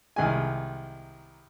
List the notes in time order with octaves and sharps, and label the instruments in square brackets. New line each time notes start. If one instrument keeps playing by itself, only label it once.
[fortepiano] C2 D#3 G#3 G#5